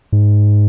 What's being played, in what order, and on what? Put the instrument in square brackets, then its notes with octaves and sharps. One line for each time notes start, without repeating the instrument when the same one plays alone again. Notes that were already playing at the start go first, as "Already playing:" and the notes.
[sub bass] G#2